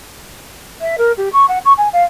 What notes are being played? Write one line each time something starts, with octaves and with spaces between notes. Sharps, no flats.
E5
A#4
G4
C#6
F#5
C#6
G#5
F5